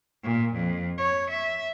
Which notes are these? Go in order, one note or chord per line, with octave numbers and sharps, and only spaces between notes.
A#2
F2
C#5
E5